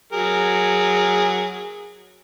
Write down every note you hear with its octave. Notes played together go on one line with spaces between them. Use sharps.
F#3 G#4 A#4